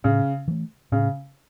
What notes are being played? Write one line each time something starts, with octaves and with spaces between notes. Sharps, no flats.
A2 C#3
E3 A3
A2 C#3